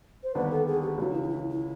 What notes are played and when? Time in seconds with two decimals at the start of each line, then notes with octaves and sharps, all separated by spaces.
0.23 C5
0.35 D#2 D3 G3 B3 D4 B4
0.51 A4
0.67 G#4
0.82 G4
0.98 C#2 C#3 E3 F#4
1.14 E4
1.23 D#4
1.29 E4
1.51 E4